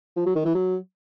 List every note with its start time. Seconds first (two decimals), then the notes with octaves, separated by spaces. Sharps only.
0.16 F3
0.26 F#3
0.35 D#3
0.45 E3
0.55 F#3